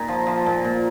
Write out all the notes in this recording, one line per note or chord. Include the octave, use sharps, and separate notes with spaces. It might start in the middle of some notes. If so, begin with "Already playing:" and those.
Already playing: A#2 D#4
F3
F3
A#2
A#2